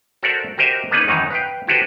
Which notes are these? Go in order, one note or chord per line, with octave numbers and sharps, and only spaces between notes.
F#4 A4 A#4 C5 D5 E5
F#4 G4 A#4 C5 D#5 E5
A#3 B3 C#4 D#4 G#4 B4
F#2 D#3 E3 F#3 D#4 C#5
B4 F5 G5
E4 F#4 G4 A4 B4 C5